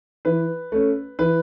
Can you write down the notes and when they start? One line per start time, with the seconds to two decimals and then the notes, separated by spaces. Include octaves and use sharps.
0.25 E3 B4
0.72 A3 C#4
1.19 E3 B4